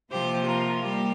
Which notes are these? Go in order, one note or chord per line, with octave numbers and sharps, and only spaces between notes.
C3 F3 A#3 G4 C5
F4 A#4
G3 A#3 G4